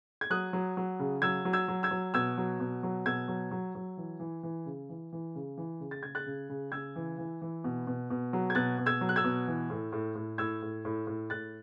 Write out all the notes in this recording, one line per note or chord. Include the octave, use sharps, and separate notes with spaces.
G#6
F#3 D#6 F#6
F#3
F#3
C#3
F#3 E6 G#6
F#3
E6 G#6
F#3
E6 G#6
F#3
B2 E6 G#6
F#3
B2
F#3
B2 E6 G#6
F#3
F#3
F#3
E3
E3
E3
C#3
E3
E3
C#3
E3
C#3
A6
C#3 G#6
F#6 A6
C#3
C#3
C#3 E6 G#6
E3
E3
E3
B2
B2
B2
F#3
G#6
B2 F#6 A6
B2
E6 G#6
F#3
F#6
E6 G#6
B2
E3
A2
A2
A2
A2 E6 G#6
A2
A2
A2
A2 F#6 A6